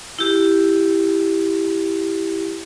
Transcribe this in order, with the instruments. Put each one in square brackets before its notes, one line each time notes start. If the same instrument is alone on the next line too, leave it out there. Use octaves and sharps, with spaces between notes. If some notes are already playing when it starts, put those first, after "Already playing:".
[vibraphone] E4 G4